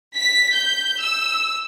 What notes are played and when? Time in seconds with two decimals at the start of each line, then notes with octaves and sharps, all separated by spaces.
0.16 B6
0.53 G6
1.01 E6